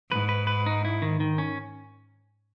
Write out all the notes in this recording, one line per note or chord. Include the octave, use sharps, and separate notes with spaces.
G#2 B4
B4
B4
D#4
E4
D#3
D#3
C#4